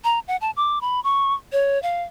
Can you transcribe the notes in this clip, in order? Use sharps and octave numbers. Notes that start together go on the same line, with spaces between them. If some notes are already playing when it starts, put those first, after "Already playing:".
A#5
F#5
A5
D6
B5
C#6
C#5
F5